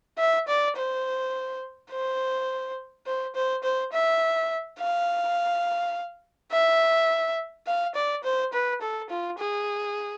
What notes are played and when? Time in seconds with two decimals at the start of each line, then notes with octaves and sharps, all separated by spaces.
0.18 E5
0.48 D5
0.76 C5
1.91 C5
3.06 C5
3.35 C5
3.63 C5
3.93 E5
4.79 F5
6.52 E5
7.67 F5
7.95 D5
8.24 C5
8.53 B4
8.82 A4
9.10 F4
9.39 G#4